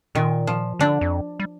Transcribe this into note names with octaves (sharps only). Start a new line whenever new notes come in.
A#2 D#3
F3
D3 D4
F2
G3